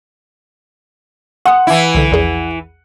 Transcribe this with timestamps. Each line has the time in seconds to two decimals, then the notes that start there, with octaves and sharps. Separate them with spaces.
1.45 F#5 C6 D#6
1.67 E3 E4
1.95 C2 D3
2.11 A#1 E2 G#4